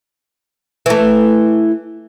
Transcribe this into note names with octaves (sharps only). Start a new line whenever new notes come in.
E3 A3